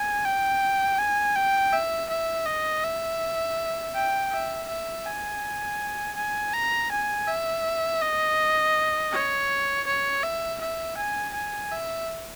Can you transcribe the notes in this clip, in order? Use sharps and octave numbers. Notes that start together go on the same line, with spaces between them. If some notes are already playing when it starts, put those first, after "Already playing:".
Already playing: G#5
G5
G#5
G5
E5
E5
D#5
E5
G5
E5
E5
G#5
G#5
A#5
G#5
E5
D#5
C#5
C#5
E5
E5
G#5
G#5
E5